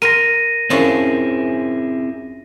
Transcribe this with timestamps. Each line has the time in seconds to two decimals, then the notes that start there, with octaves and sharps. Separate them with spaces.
0.02 A#4 C6 A#6 D#7
0.70 F#2 F3 C4 E4 G#4